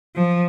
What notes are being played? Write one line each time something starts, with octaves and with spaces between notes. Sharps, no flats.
F3